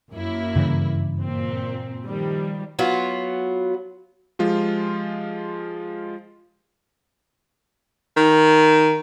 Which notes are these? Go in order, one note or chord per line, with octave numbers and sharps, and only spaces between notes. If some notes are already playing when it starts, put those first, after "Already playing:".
F#2 A#3 E4
G2 C#3 E3
A#2 C4
D#3 F3 G3
F#3 B3 F4
F3 G#3 F4 G4
D#3